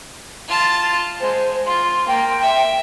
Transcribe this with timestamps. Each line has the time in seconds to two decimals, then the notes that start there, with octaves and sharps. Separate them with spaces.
0.48 F4 A5
1.20 G#3 C5
1.67 F4 C6
2.08 A#3 G5
2.42 E5